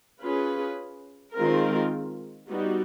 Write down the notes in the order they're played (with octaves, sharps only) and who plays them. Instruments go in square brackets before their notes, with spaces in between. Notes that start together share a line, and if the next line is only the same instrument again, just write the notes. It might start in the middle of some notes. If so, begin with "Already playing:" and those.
[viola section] C#4 F4 G#4 B4
D#3 G#3 C4 F4 A#4
G3 B3 D#4 F#4